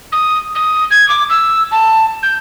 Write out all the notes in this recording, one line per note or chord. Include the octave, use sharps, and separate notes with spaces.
D#6
D#6
G#6
D6
E6
A5
G6